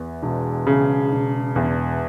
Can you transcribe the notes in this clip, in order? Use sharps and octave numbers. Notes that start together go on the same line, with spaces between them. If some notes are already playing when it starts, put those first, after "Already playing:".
Already playing: E2
E1
C#3
E1
E2